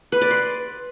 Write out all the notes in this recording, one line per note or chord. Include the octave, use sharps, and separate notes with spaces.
B4
D5
C6